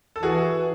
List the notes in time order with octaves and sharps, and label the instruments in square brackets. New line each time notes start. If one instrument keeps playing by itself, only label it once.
[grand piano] A4
[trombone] E3 [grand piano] F#4 G#4